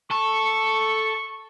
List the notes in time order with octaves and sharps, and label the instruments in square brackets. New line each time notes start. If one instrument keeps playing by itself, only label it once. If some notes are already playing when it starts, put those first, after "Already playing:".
[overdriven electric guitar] A4 [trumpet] C#6